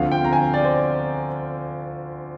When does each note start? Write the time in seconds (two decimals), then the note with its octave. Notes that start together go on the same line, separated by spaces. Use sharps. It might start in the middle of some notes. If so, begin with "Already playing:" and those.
Already playing: D2 D3 F3 C4 F5
0.12 G5
0.25 A#5
0.33 G#5
0.54 D5
0.65 C5